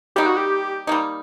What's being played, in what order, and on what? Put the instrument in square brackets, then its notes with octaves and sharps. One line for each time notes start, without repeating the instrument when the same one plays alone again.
[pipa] G3 A#3 D#4 [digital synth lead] G4
[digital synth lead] F#4
G4
[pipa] G3 A#3 D#4